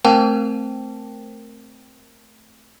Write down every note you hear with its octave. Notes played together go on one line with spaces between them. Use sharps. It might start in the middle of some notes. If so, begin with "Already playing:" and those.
A3 C4 A#4 C5 G5 A5